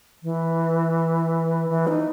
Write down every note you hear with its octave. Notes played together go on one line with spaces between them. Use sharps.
E3
E3
D#4